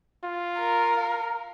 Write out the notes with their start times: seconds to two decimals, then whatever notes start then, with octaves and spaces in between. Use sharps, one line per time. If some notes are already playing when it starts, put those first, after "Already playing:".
0.23 F4
0.59 A#4
0.97 F5